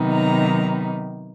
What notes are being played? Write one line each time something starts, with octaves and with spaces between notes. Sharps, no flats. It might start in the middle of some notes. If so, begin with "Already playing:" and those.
Already playing: C3 D#3 F#3 B3 D#4
A#5